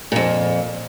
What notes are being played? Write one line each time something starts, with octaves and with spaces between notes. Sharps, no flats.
F2 A#2